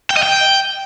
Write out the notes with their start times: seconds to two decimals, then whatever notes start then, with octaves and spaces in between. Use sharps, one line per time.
0.10 G5
0.17 D#5
0.23 G5